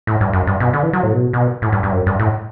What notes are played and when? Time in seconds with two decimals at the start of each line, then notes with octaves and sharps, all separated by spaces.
0.07 A2
0.21 G2
0.33 F#2
0.47 G2
0.60 B2
0.73 D3
0.83 E3
0.93 F#3
1.03 A2
1.13 B2
1.33 B2
1.62 A2
1.72 G2
1.83 G2
1.92 F#2
2.06 G2
2.20 A2